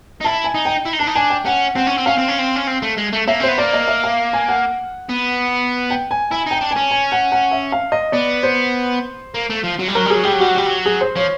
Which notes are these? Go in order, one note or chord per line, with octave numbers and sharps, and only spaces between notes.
D#4
E4 A5
G#5
D#4
G5
E4
D#4
D4 A5
D#4
D4 G#5
G5
C#4 F#5
C4 F#5
C#4
C4
C#4 F5
C4
C#4
C4
C#4
C4
A3
G#3
A3
A#3 E5
C4
B3 C5
A#3 D5
D#5
E5
F5
G#5
F#5
B3
G5
G#5
E4 G#5
D#4 G5
D4
G#5
C#4
G#5
F#5
F#5
E5
F5
D#5
B3 D5
C5
A#3
A3
F3
F#3
G3
F#3 A#4
G3
F#3 G#4
G3 G4
F#3
G3 F#4
F#3
G3 G4
F#3
G#4
C5
F3 C#5